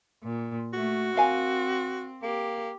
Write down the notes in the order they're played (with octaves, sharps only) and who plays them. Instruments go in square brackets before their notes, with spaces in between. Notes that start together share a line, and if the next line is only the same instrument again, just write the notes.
[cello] A#2
[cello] A3 [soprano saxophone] F#4
[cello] C4 [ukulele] A#4 F5 G#5
[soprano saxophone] A#3 [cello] G4